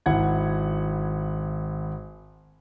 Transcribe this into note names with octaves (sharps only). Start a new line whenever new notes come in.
G#1 E4 F#5 G#6